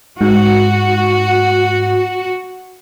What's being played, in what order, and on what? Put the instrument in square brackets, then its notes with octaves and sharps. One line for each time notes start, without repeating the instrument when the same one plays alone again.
[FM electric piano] G#2 [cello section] F#4